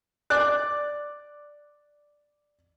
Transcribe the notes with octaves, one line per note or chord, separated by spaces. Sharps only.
D5 F#6